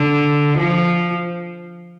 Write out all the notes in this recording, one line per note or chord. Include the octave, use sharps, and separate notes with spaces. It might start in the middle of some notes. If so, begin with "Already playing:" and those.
Already playing: D3
F3